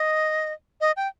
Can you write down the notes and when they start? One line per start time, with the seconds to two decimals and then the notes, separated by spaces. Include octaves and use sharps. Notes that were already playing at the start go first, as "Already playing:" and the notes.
Already playing: D#5
0.81 D#5
0.97 G5